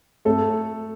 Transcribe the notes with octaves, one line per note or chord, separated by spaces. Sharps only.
A3 A4